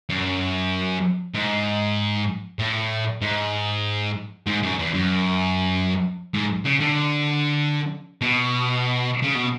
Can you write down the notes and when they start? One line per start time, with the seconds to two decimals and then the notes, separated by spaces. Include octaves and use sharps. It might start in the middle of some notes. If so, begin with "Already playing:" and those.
0.09 F#2
1.34 G#2
2.59 A2
3.22 G#2
4.46 G#2
4.63 F#2
4.78 E2
4.94 F#2
6.34 G#2
6.65 C#3
6.81 D3
8.21 B2
9.23 C#3
9.35 B2